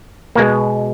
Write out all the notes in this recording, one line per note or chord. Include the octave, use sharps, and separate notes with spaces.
B2 G#3 A#3